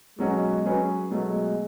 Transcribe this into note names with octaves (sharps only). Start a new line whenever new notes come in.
B2 F#3 G#3 C#4 F#4
F#3 C#4 G#4 B4
B2 F#3 G#3 A3